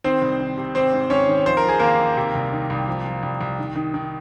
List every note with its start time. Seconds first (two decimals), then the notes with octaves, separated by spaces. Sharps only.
0.04 D#3 C4 C5
0.22 C2
0.40 D#3
0.58 C3
0.75 G#1 C4 C5
0.93 G#2
1.10 G#1 C#4 C#5
1.29 D#3
1.46 F3 C5
1.57 A#4
1.64 F3 G#4
1.79 D#2 A#3 A#4
1.99 D#2
2.17 C3
2.35 C2
2.52 D#3
2.70 C2
2.88 F3
3.06 F3
3.23 C2
3.41 C2
3.59 D#3
3.76 D#3
3.94 D#3